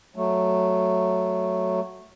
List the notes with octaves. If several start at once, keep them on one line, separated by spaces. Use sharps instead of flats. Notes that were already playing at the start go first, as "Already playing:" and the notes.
F#3 A3